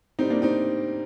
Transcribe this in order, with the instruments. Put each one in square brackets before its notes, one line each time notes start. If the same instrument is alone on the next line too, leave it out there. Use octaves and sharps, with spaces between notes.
[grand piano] A2 G3 C4 D#4
A#3 D4
C4 D#4